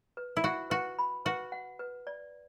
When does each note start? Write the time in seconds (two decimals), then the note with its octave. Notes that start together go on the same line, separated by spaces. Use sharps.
0.17 B4
0.37 E4
0.43 F#4 F#5
0.70 F#4 B4
0.99 B5
1.26 F#4 B4
1.52 F#5
1.79 B4
2.07 D5